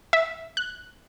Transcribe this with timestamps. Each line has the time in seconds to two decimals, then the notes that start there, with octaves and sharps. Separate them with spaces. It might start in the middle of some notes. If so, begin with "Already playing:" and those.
0.13 E5
0.57 F#6